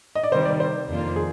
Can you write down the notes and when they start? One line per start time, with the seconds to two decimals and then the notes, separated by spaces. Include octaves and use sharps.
0.15 D#5
0.24 D5
0.31 C3 D#3 G3 C5
0.45 D5
0.60 C5
0.89 F2 D#3 A#3 D4 F4
1.16 G#4